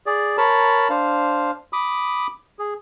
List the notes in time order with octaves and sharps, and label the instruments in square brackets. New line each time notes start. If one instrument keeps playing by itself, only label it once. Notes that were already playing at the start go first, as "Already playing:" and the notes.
[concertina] G#4 D5
A#4 C#5 A5 B5
D4 C5 F5
B5 D6 D#6
G#4